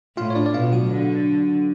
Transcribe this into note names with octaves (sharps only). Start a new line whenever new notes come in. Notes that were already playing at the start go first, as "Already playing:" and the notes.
A2 F4 F5
C#5
D4 D5
D5
B2 F4 F5
F#3 F#4
D3